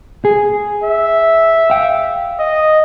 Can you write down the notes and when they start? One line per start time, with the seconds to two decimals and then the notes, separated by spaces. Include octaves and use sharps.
0.25 G#4
0.83 E5
1.70 F5 G5
2.39 D#5